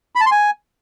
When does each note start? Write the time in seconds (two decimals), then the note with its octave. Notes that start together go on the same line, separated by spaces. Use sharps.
0.15 B5
0.21 A5
0.26 C6
0.31 G#5